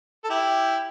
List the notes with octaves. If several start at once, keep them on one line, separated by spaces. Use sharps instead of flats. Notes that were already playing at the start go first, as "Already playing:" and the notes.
A4
E4 G4